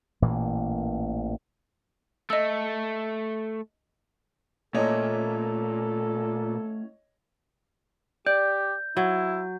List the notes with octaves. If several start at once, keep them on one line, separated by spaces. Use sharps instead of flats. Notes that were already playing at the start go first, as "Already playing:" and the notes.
A1 A#2 E3 A#3
A3 D#5 E6
A#2 A3 C#4 E4 A4 C#5 D#5
G4 D5 G6
F#3 E4